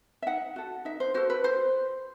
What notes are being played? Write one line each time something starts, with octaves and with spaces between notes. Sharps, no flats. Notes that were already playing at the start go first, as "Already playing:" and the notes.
E5
D#4 F#5
F#4 A4
D#4 E5
C5
F#4 A4 C5
B4
F#4 C5